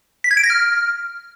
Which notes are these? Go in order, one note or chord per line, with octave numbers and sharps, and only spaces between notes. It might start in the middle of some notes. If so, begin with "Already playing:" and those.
B6
G#6
D7
A#6
F6